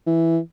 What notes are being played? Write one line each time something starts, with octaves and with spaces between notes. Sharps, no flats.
E3